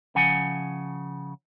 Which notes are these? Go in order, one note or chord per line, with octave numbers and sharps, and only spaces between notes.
C#3 F3 F#5 G#5